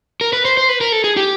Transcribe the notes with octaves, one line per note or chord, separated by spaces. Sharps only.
A#4
B4
C5
C5
B4
A#4
A4
G#4
G4